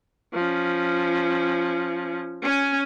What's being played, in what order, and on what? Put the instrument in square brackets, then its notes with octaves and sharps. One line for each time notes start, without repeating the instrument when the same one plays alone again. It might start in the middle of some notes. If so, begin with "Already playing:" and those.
[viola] F3 C#4
C#4 G#5